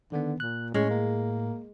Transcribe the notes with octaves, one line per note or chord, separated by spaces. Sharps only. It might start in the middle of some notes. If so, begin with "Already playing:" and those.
D3 D#3 B3
A#2 F#6
A2 G#3 C#4
A#3